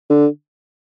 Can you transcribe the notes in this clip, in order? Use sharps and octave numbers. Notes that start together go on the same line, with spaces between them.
D3